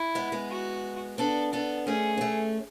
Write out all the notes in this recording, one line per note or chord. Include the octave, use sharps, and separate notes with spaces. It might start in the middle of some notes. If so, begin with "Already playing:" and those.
Already playing: E4
G#3 B3
G#3 B3
F#4
B3 D4 A4
B3 D4 A4
A3 C#4 G#4
B3
A3 C#4